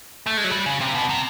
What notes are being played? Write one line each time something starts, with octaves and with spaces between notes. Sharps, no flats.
A3
G#3
F#3
G3
C#3
C3
B2
C3